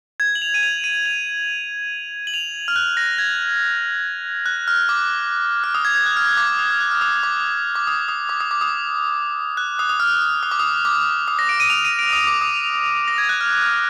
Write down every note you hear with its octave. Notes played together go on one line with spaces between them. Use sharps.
G#6
F#7
F7
D#7
F7
D#7
F7
F#7
F7
F6
F#6
A#6
G#6
F#6
F6
D6
F6
D#6
G#6
G#6
F#6
F6
D6
D#6
F6
F#6
F6
D#6
D6
D6
D#6
D#6
D6
D#6
D6
D#6
F#6
D#6
D#6
F6
D#6
D6
D#6
D6
D#6
A#6
D7
D#7
F7
D#7
D7
D#6
D#6
D6
D#6
A#6
G#6
F#6
F6
F6